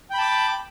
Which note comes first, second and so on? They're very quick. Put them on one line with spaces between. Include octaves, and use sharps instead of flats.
G5 B5 A5 D6